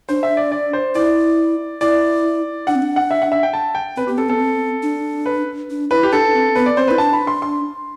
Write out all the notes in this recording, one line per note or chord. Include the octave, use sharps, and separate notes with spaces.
D4 C5
E5
D5
D5
C5
E4 D5
E4 D5
D4 F#5
C4
D4
F#5
E5
F#5
E5
G5
A5
G5
C4 B4
B3 G4
C4 A4
B3 A4
C4
D4
B4
D4
E4 B4
G4
D4 A4
C4
B3 B4
D5
C4 C5
E4 B4
D4 A5
B5
C6
C6